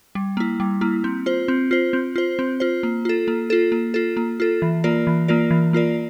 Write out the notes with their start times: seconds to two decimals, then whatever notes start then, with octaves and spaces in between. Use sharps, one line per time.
0.15 G3
0.37 A#3 E4
0.60 G3
0.81 A#3 E4
1.04 C4
1.26 F4 C5
1.48 C4
1.71 F4 C5
1.93 C4
2.16 F4 C5
2.39 C4
2.60 F4 C5
2.83 A#3
3.05 F4 A4
3.28 A#3
3.50 F4 A4
3.72 A#3
3.94 F4 A4
4.17 A#3
4.40 F4 A4
4.62 E3
4.84 A#3 F4 A#4 D5
5.07 E3
5.28 A#3 F4 A#4 D5
5.51 E3
5.73 A#3 F4 A#4 D5